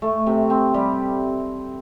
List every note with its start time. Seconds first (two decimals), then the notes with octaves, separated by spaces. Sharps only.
0.02 A3
0.27 C3
0.50 C4
0.74 G3